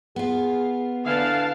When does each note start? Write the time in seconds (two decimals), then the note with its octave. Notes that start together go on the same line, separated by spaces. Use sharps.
0.16 B3 F4 G#4
1.06 D3 E3 F5 A5